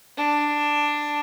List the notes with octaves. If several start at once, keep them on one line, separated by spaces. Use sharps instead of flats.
D4